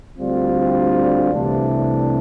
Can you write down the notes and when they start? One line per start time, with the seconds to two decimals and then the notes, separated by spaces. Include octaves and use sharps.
0.17 D2 D3 G3 C4 F4
1.32 C2 C3 E3 A3 D4